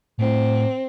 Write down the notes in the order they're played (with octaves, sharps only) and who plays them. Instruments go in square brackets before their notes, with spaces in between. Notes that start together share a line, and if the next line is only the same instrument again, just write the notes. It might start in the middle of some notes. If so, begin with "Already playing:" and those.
[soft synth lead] A2 [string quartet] C4